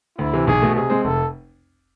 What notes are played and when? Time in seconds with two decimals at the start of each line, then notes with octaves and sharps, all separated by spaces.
0.18 D2 E4
0.33 C3 E3
0.47 B1 G#4
0.61 B2 A3
0.75 C3 G#4
0.90 G#3 C4
1.04 F1 A4